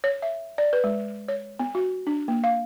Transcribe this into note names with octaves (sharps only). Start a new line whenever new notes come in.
C#5
E5
D5
B4
G#3
C#5
B3
F#4
D4
A#3
F5